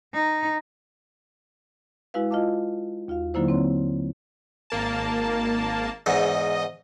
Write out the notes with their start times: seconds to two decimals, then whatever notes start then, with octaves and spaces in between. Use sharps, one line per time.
0.14 D#4
2.14 G#3 E4 F#4 B4 F5
2.31 F4 D#5 F5 A5 D6
3.08 D#2 F4 F#4 F5
3.34 D3 F#3 A#3 D#4 E4 C5
3.48 C4 C#5 C6
4.70 G#1 A#3 A5
6.06 E2 G#2 D#5